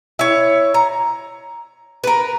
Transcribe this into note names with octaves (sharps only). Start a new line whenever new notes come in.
E4 C#5
A#5
A#4 B4